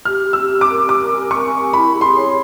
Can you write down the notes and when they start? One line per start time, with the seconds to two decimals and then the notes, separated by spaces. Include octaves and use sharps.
0.05 G4 F6
0.27 G4
0.33 E6
0.48 G4
0.61 D6
0.68 A#4
0.89 A#4 D6
1.10 G#5
1.31 A#4 C#6
1.52 G4
1.73 E4 B5
1.94 G#4
2.01 C6
2.15 C#5